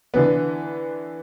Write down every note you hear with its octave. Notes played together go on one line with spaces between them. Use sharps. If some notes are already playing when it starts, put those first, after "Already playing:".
D3 E3 B3